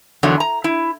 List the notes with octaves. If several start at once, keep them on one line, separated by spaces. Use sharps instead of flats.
E2 D3 D#3 F#3
A#5
E4